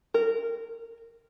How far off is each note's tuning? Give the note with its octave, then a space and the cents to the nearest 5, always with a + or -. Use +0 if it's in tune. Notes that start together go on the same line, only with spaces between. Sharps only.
A#4 -15